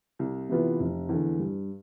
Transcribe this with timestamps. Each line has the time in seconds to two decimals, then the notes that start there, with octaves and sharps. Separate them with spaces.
0.19 C2
0.49 C3 E3 B3 F4
0.80 F1
1.09 E2 D3
1.39 G2